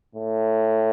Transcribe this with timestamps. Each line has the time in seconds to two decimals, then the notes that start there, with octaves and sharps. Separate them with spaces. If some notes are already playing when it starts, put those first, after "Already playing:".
0.15 A2